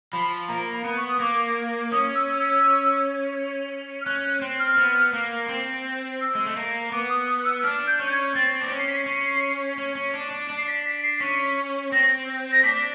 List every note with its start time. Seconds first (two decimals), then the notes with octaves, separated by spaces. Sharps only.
0.13 F3 B5
0.48 A#3 A#5
0.73 B5
0.84 B3
0.97 C#6
1.08 D#6
1.20 A#3 D6
1.92 C#4 D#6
2.15 E6
2.39 E6
4.01 F6
4.06 C#4 F#6
4.24 F#6
4.42 C4
4.59 F6
4.78 B3
5.13 A#3
5.49 C4
6.21 E6
6.35 G#3
6.46 A3
6.56 A#3
6.92 B3 D6
7.10 D#6
7.27 D#6
7.45 E6
7.63 D4 F6
7.87 G6
7.99 C#4
8.06 G6
8.12 G#6
8.35 C4 A6
8.61 D4
8.70 C#4
8.79 C7
8.88 B6
8.96 C7
9.06 C#4
9.78 C#4
9.95 C#4
10.14 D4
10.31 D4
10.50 D4
10.58 C7
10.68 B6
10.86 B6
11.03 C7
11.20 C#4 B6
11.92 C4 A#6
12.52 A#6
12.63 D4 B6